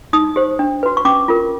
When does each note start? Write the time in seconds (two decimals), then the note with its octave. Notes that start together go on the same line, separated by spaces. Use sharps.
0.13 D#4 D#6
0.36 G4 C5
0.59 D4
0.83 F#4 B4
0.97 C#6
1.05 C#4 D6
1.28 F4 A#4